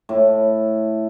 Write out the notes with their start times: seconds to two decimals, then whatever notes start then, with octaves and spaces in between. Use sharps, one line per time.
0.09 A2